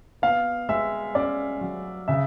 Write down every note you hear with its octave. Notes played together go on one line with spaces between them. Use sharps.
B3 F5
G#3 E5
C#4 D5
F#3
C#3 E5